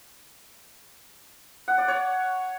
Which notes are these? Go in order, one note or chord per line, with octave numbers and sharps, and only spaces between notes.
F#5
D5
C#5